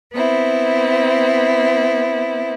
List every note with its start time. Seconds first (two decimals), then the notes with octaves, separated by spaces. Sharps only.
0.12 B3 C4 E4